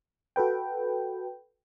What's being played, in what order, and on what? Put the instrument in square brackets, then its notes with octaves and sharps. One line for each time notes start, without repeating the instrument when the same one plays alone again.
[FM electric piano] F#4 A4 B4 G5